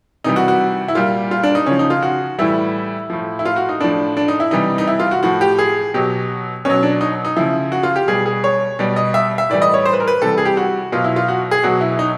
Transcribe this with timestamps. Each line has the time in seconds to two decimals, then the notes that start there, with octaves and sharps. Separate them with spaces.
0.24 C3 E3 G3 D#4
0.36 F#4
0.48 F#4
0.88 E4
0.95 A#2 G3 F4
1.31 F4
1.43 D4
1.55 D#4
1.66 C#3 F3 C#4
1.79 D#4
1.90 F4
2.02 F#4
2.39 A2 E3 G3 E4
3.10 A2 F3
3.39 E4
3.45 F4
3.56 F#4
3.69 D#4
3.80 A2 F3 D4
4.17 D4
4.28 D#4
4.40 E4
4.51 C3 E3 G3 D#4
4.78 D#4
4.87 E4
5.00 F4
5.11 F#4
5.23 A2 F3 F#4
5.41 G4
5.59 G#4
5.94 B2 F#3 G4
6.65 B2 F#3 C#4
6.83 D4
7.01 D#4
7.25 D#4
7.37 C#3 F3 E4
7.72 F#4
7.83 F4
7.96 G4
8.08 B2 G3 G#4
8.26 G#4
8.44 C#5
8.79 B2 G3 D5
8.96 D#5
9.14 E5
9.38 E5
9.50 A2 E3 G3 D5
9.62 D#5
9.74 C#5
9.86 C5
9.93 B4
10.00 A#4
10.08 B4
10.22 C3 E3 G3 A4
10.38 G#4
10.45 G4
10.57 F#4
10.92 B2 F#3 F4
11.04 E4
11.16 F4
11.28 F#4
11.51 G#4
11.64 B2 F#3 F#4
11.81 E4
11.99 D#4